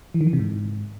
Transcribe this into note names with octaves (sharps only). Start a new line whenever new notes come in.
E3
D#3
E3
C3
G#2